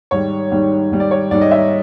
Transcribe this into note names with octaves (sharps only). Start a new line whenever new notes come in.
G#2 D#3 G3 C#5
G#2 D#3 G3
G#2 D#3 G3
D5
C#5
G#2 D#3 G3 D5
D#5
E5